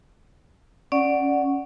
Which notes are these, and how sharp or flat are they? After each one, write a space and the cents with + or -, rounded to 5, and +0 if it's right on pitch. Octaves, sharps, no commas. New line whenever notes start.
C#4 +0 D5 +0 F#5 +0